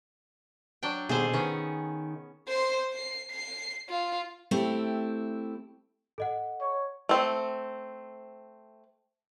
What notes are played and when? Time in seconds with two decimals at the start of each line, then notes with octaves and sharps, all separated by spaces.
0.83 F#3 D4 G5
1.09 B2 D#3 G3 G#4 A4 C5
1.33 D#3 B3 C#4
2.48 C5 C6
2.93 C7
3.31 C7
3.89 F4
4.51 A3 C4 E4 G4
6.18 A4 D#5 F#5
6.61 C#5
7.09 A3 C4